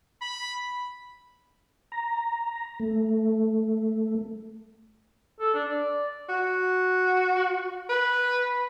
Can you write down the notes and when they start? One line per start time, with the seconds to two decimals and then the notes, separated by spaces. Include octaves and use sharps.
0.22 B5
1.92 A#5
2.80 A3
5.40 A4
5.54 D4
5.69 D5
6.29 F#4
7.90 B4